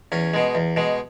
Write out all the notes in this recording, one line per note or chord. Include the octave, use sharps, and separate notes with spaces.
E2 C#4
B2 G#3
E2
B2 G#3